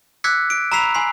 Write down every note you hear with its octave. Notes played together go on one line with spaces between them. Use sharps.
D6 E6 F#6 G#6 B6 C#7
D7
A#5 B5 E6 B6 C7 F7
G#5 C6 C7